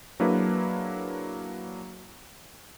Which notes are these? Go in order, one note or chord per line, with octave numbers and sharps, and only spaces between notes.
F#3 A#3 D4 E4 G#4 B4